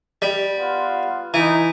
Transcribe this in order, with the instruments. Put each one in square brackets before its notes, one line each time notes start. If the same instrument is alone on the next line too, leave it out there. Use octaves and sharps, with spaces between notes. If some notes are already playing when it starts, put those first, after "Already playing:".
[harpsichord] G3
[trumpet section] B3 F4
[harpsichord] E3 [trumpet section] D#4